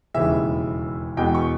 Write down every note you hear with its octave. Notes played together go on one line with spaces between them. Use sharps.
E1 D#2 C#3 E3 E5
E2 B2 G#3 B3 G5
C#6